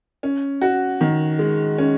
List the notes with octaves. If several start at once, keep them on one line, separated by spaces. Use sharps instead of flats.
C#4
F#4
D#3
G#3
C#4